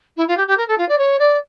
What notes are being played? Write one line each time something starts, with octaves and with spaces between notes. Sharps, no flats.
E4
F4
G4
G4
A#4
A4
F4
D5
C#5
D5